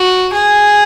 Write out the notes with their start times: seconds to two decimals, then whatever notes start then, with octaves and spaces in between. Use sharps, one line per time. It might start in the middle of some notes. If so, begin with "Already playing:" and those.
Already playing: F#4
0.33 G#4